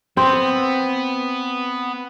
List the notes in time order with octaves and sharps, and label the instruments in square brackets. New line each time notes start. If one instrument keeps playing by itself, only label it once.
[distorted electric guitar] B3 [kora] C4